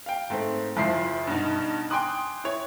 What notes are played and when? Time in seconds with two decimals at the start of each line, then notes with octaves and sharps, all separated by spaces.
0.06 F5 G5
0.30 G#2 A3 C4
0.76 F#1 F3 E4 F4 C6 C7
1.27 G2 B2 D#4
1.90 G5 G#5 C6 D6 D#6 F#6
2.44 E4 C#5